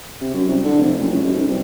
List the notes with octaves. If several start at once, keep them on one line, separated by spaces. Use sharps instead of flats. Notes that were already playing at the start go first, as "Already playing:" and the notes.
C3
F#2
C2
D3
F1
F#1
C#2
F#2
B1
C2